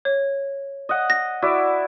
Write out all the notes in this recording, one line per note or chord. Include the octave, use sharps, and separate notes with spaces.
C#5
D#5 F#5
A#6
E4 F#4 D5